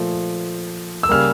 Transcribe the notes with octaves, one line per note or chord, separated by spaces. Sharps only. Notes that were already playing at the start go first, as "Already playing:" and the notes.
Already playing: A#2 F3 A3
E6
C#3 G3 A#3 F6